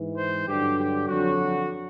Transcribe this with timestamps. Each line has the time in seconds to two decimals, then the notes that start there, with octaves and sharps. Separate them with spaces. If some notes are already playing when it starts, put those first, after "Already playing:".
Already playing: G#2 E3
0.17 C5
0.48 G2 D3 F#3 G4
0.78 G4
1.07 F2 D3 F#3 F#4